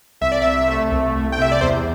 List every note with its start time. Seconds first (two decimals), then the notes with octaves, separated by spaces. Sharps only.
0.21 C2 E5
0.32 D5
0.42 C3 E5
0.68 A3
0.92 C2
1.15 C2
1.32 G5
1.38 C3 E5
1.52 D5
1.61 E2 C5